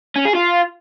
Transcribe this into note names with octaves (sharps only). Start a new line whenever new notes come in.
C#4
G#4
F4